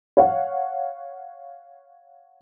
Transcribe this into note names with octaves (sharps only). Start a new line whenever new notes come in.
C#5 F5 F#5